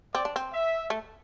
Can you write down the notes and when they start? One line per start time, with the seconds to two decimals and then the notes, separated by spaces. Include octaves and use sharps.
0.14 C4 D5
0.25 D4
0.36 C4
0.53 E5
0.90 A3